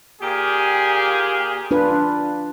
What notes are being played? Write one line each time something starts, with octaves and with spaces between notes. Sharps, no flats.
A#2 G4 G#4
D4 F4 B4